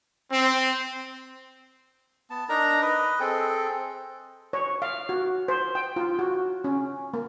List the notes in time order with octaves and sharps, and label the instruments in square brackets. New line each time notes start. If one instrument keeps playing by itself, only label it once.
[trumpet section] C4
[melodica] B3 A5
D4 D#4 A#4 A#5
B4 D#5
C4 G#4 A4 G5
[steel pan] C#5
F5
F#4
C5
G5
F4
F#4
C#4
A#3